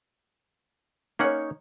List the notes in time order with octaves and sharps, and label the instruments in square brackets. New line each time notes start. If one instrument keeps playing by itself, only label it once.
[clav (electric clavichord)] A#3 C#4 F#5 [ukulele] D#4 C#5